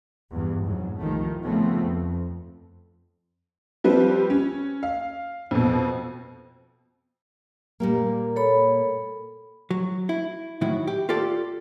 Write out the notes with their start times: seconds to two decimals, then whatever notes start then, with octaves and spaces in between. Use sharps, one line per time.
0.31 E2 G2
0.64 F2 G#2 B2 F#3
0.98 C2 D#3 F3 A3
1.43 C#3 F3 A3 B3 C4
1.84 F2
3.84 F3 G3 C4 B4
4.30 C#4
4.83 F5
5.51 F2 B2
7.80 A#2 G3 A#3
8.36 A4 C#5 B5
9.71 F#3
10.09 E4
10.61 A2 D#3 F#3 E4
10.87 G4
11.09 F4 G4 A4 D5